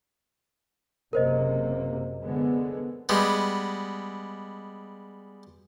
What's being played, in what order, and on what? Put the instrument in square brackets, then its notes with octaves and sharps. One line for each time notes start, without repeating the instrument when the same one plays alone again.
[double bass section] F#1 C3 A#3 [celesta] A#4 C5 D#5
[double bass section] D3 G#3 B3
[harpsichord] G3 G#3 B3